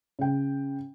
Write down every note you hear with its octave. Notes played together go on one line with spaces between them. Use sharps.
C#3 G5